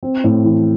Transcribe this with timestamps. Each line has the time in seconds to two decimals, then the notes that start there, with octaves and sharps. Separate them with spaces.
0.03 C4
0.24 A2
0.44 E3